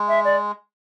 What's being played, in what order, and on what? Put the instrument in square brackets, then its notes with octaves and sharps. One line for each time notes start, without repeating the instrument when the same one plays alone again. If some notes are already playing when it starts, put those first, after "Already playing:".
Already playing: [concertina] G#3
[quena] E5
D5